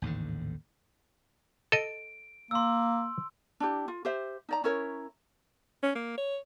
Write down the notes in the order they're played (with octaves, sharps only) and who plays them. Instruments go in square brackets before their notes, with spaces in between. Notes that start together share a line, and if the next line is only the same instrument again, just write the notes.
[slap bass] A1 D#2 G#2 D3
[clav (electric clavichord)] A4 D#5 [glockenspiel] D7
[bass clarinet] A#3 [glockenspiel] C6 E6
[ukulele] D4 E4 G4
F4
G4 C5 E5
D#4 D5 A#5
C#4 E4 A#4 C#5
[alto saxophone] C#4
A#3
C#5